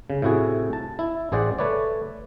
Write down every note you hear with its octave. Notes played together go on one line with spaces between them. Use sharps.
C#3
A2 C3 E4 F#4 G#4
A5
E4
A1 G#4 C5 D5 F#5
A3 B4 C#5 D5